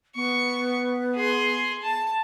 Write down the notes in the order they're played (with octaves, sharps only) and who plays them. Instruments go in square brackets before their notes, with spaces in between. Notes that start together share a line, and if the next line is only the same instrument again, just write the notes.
[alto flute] B3 [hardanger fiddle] C#6
[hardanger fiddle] G#4 C6
A5